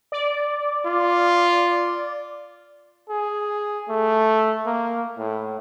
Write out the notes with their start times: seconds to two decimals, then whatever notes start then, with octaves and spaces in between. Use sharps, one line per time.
0.12 D5
0.86 F4
3.09 G#4
3.89 A3
4.66 A#3
5.18 A2